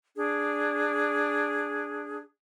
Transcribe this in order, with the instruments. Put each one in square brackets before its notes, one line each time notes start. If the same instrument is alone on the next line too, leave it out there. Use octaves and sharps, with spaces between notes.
[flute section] D4 G#4